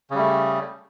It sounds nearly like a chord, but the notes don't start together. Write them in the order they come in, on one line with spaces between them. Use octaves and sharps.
C#3 G3 A3